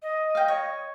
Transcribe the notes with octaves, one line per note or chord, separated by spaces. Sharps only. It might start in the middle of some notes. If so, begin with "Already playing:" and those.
D#5
F5 G5
C#5